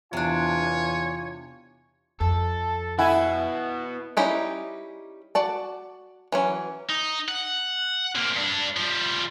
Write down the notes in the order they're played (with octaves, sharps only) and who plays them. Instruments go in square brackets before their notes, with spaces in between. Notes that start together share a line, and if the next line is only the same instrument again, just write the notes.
[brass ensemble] E2 G#5 [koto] C3 D4 [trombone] F4 [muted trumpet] C#5
[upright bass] F2 [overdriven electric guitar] A4
[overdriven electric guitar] B3 F#4 [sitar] E4 [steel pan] F#5 G#5
[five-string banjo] G3 C#4 D#4 E4 G4
F#4 D5 A5
E3 F#3 C#4
[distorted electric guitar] D#4
F#5
C3 A#3
G2 D4
F3 G3